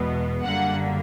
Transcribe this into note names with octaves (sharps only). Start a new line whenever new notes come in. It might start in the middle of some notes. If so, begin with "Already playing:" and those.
Already playing: E2 B2 G#3 B3
F#2 D3 G3 A#3 F#5